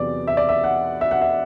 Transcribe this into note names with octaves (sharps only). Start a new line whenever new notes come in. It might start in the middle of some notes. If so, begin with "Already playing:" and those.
Already playing: E2 C3 F#3 B3 D5
E5
D5
E5
F#5
E5
F#5
E5